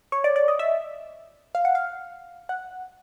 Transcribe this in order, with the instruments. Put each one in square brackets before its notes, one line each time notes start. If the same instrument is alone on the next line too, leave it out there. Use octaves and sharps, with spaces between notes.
[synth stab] C#5
D5
D5
D#5
E5
F5
F#5
F5
F#5